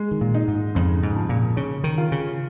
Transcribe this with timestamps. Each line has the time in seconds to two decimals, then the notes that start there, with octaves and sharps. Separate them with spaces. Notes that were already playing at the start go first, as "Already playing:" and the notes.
Already playing: G#3
0.11 D#3
0.21 A#2
0.34 D#4
0.48 G#2
0.75 F2 C#3
1.03 G#2
1.16 F3
1.29 A#2
1.56 C#3 C#4
1.84 D#3
1.98 F4
2.12 C#3